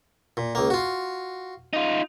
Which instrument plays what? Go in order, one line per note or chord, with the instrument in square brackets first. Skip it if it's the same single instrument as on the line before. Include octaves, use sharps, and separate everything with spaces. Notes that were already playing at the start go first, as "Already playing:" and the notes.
[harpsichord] A#2
C#2 A#3
F4 F#4
[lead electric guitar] D#4 F4